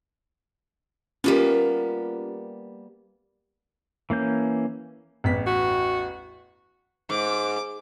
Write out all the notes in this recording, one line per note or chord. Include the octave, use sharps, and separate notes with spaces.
G3 A#3 B3 C#4 F4 G4
E3 A#3 C#4 G6
A1 E2 B6
F#4
G#2 D6